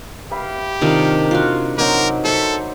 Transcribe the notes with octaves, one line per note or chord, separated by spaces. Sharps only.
G4 E5 F5 B5
C3 D#3 D4 D#4 F4 A#4
F4 F#4
F#3 C4 D#4 A#4 C5 D6
A4 C5 E5 C#6